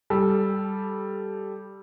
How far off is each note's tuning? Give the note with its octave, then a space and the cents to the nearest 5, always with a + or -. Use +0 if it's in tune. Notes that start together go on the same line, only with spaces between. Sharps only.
G3 +0 A4 -10